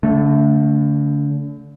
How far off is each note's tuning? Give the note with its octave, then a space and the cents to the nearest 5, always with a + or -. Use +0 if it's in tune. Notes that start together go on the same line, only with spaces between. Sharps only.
D3 -35 A3 +0